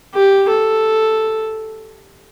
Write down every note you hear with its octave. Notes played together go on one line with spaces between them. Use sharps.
G4
A4